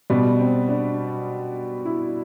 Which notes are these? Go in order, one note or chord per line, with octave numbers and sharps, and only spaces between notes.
B2 G3 B3
C4
D4
E4